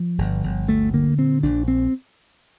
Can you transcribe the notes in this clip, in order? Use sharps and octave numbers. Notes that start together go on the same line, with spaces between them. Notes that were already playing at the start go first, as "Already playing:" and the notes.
Already playing: F3
G1
G1
D2 A3
D3 A#3
A#2 C4
A#1 D4
C4